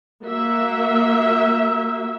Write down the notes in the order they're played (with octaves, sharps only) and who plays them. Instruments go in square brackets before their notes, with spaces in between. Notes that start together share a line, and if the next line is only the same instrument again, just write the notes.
[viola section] A#3 F#4 E5